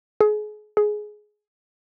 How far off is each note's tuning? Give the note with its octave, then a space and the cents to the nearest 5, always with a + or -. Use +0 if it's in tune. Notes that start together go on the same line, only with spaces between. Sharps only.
G#4 +30
G#4 +15